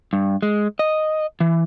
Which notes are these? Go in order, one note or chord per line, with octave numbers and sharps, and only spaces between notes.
G2
G#3
D#5
E3